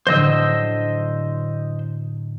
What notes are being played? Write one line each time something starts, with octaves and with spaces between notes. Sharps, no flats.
A2 D3 F#3 C5 D#5 E6